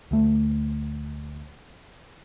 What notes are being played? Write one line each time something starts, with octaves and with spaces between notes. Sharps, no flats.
D2 A3